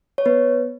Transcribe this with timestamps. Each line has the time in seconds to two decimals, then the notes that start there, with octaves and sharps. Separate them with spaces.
0.18 C#5
0.26 B3 B4